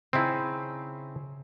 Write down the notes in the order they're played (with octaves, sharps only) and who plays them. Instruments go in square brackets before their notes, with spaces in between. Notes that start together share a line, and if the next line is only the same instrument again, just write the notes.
[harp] C#3 C#4 G#4 [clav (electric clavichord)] C4 D#4 E4